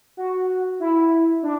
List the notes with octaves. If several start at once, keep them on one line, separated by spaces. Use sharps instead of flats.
F#4
E4
D4